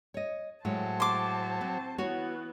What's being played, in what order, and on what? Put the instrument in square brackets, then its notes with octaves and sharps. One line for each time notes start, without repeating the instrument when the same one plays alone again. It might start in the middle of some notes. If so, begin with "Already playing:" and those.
[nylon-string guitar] C#5 D#5
[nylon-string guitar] A2 G#3 C#5 [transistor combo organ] F#3 [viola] C5 A5
[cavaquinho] C6 D6
[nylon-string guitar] C4
[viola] E3 B3 [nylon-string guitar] F#4 C#5